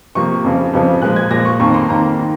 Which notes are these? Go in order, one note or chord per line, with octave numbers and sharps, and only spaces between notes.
C3 F3 A#3 C#6
F2 C#3 F3
F2 C#3 F3
A#2 F3 G#3 F#6
G#6
A#2 F3 G#3 A#6
C#6
F2 D#3 A#3 C#6
C6
F2 D#3 A#3 A#5
D#3